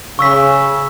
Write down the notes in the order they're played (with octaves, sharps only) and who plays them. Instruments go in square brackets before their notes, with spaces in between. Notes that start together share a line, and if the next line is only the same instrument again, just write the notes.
[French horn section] C#3 [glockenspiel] C#6 E6 B6